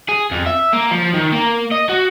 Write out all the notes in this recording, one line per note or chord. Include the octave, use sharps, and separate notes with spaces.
G#4
F2
E5
A#3
F3
D#3
A#3
D#5
F#4